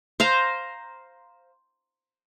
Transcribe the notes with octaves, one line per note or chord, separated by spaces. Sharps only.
C5 F5 A#5